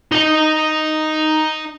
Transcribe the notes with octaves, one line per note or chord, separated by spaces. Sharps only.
D#4 D#5